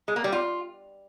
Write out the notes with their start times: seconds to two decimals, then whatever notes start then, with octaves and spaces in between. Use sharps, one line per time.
0.08 G#3
0.16 A#3
0.24 G3
0.32 F4